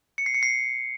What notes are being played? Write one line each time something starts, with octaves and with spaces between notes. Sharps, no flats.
C#7
C7
C#7
C7